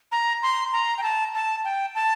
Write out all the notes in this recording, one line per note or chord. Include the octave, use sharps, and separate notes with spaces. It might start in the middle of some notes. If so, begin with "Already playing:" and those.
A#5
C6
A#5
G5
A5
A5
G5
A5